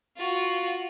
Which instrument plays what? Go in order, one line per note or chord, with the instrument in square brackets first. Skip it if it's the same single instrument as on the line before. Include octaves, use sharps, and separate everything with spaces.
[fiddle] F4 F#4